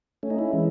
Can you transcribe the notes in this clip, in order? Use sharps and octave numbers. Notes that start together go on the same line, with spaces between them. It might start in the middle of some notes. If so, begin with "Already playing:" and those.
A3 C#4
D#4
C#4 E4
E3 G#3